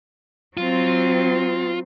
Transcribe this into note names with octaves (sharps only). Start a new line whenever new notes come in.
F#3 C4 F4